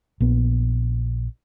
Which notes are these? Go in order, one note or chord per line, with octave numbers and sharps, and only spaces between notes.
A#1 B3